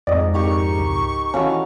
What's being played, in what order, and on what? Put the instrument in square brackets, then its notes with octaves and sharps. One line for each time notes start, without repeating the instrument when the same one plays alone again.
[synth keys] F2 G#2 [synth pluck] D5 D#5
[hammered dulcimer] D#4 G4 A#4 [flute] C#6
[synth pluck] C#2
[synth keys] D#3 E3 [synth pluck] C#4 F#4 A4 [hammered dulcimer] F5 F#5 B5